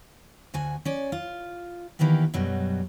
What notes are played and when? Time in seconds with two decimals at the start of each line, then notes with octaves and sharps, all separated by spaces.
0.54 D2 F#4 G#5
0.85 C#4 D5
1.12 F4
1.99 D#3 E3 A#3 B3 G4
2.34 F#2 B2 F#3 G3